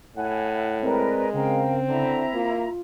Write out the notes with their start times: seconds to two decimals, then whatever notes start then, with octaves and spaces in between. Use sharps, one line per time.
0.17 A2 E4 F#5 G#5
0.82 G#3 C4 A#4 B4 D5
1.33 C#3 C4 A#4 F5 G5
1.89 D3 E4 E5 A#5
2.34 A#3 F4